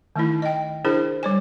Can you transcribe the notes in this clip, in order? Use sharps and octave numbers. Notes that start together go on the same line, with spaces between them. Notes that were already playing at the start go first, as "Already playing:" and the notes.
D#3 A3 D#4 E4
D#5 G5
D4 E4 G#4 A#4 C5
G3 D5 G#5